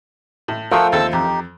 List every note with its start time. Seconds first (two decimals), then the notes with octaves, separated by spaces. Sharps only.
0.48 A2
0.71 F3 A3 F4 A#4 F#5 G5 E6
0.92 D#2 C4 A4 A5 E6
1.13 F2 D#4 G4